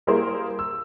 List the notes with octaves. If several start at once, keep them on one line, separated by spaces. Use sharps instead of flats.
G3 A#3 E4 G#4 A#4 C5
E6